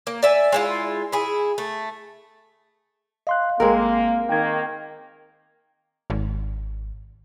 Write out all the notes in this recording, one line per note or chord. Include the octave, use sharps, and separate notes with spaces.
A#3
D5 E5 G#5
G#3 E4 F4
E4 G#4
A3
D#5 F5 C6 F#6
G#1 G#3 A#3 C4 A#4
D#3 A#3 G5 G#6
G#1